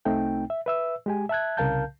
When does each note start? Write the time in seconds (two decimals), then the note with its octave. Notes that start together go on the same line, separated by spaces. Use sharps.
0.05 C2 A3 C4 D#4 G5
0.50 E5
0.66 B4 E5 E6
1.06 G#3 G4 G#5
1.29 E5 A5 F#6 G#6
1.57 C2 C#3 A#4 F5 A5 G6